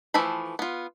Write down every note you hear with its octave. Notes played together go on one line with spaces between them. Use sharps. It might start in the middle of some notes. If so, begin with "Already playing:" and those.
E3 F3 A3 B5
B3 F4